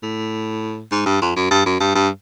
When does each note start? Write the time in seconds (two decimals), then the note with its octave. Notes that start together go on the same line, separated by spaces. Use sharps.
0.03 A2
0.92 G#2
1.06 G2
1.22 F2
1.36 F#2
1.51 G2
1.66 F#2
1.80 G2
1.95 G2